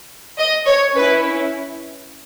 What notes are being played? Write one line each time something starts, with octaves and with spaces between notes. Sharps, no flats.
D#5
C#5
C#4 E4 B4